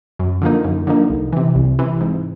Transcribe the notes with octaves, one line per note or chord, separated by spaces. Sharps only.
F#2
D3 F3 A#3 D#4
F#2
D3 F3 A#3 D#4
C2
C3 E3
C2
C3 E3
G#2